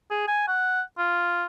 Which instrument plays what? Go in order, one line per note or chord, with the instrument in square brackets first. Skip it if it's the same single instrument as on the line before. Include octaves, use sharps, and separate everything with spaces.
[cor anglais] G#4
G#5
F#5
F4